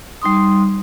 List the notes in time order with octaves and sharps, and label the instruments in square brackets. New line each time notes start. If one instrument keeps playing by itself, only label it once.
[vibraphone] G3 D#4 C6 D#6